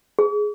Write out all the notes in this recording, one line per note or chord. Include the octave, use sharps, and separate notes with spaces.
G#4